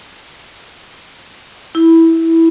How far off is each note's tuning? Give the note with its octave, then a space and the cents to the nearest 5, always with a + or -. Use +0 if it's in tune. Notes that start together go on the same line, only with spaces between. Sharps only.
E4 -10